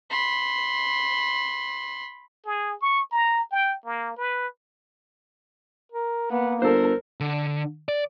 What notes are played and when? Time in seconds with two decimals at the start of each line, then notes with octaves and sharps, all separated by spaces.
0.10 B5 C6
2.46 G#4
2.81 C#6
3.12 A#5
3.52 G5
3.86 A#3
4.17 B4
5.92 A#4
6.31 A#3 B3
6.62 G1 A4 A#4 C5
7.20 D3
7.89 D5